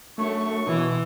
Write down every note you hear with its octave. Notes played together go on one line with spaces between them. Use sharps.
F#2 A3 D4 C#6
B2 E3